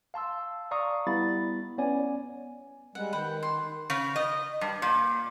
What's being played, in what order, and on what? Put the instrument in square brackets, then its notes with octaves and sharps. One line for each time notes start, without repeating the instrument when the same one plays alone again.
[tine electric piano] F5 A5 C6 E6
D5 F5 A#5 C#6 D#6
G3 B3 E4 B5 A6
B3 C#4 C#5 D5 G#5
[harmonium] G3 G#3 [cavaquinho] F#5
[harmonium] D#3 [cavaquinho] B4 F#5 G5
[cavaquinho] C6
[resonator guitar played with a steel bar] C#3
D#5
G2
A#2